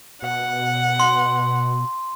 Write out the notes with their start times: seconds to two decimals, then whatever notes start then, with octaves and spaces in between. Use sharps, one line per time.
0.22 B2 F#5
1.00 C6